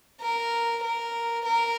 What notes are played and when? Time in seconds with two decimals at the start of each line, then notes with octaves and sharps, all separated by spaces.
0.22 A#4
0.83 A#4
1.45 A#4